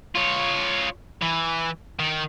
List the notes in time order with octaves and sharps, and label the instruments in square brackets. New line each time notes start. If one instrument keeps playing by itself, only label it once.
[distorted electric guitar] F4 C#5
E3
D#3